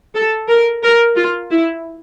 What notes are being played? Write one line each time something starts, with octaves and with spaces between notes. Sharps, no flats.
A4
A#4
A#4
F4
E4